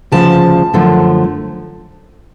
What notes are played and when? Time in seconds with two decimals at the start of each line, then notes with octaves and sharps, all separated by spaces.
0.12 D2 C#3 F3 A5
0.74 F#2 D3 F3 A3